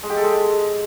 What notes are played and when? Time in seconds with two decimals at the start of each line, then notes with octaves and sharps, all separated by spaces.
0.03 G#3
0.10 G4
0.16 A4
0.23 G#3